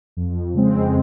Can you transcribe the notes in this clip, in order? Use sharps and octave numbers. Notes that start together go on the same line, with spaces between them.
F2
C#3 G#3 C4